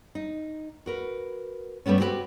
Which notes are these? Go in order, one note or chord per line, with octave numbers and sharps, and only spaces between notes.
D#4
F#4 A#4 B4
G2 G3 A3 B3 C#4
C4 F#4 G4 A4 B4